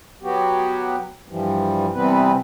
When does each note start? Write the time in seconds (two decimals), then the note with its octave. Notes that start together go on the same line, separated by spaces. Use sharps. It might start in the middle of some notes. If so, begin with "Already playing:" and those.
0.23 F#3 B3 F#4 G4
1.28 G2 E3 F3 G3
1.94 C3 E3 G3 B3 C4 B4